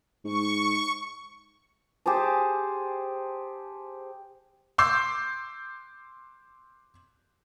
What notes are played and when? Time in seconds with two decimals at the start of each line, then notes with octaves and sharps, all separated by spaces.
0.25 G#2 C#6
2.06 G4 G#4 C5 A5
4.78 C6 D6 E6 G6 C7